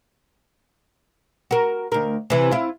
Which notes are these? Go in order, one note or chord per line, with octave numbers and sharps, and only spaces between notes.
F#4 A#4
D2 A#4
C3 E3
E4 F4